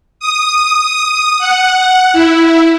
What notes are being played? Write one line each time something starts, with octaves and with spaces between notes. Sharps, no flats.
D#6
F#5
E4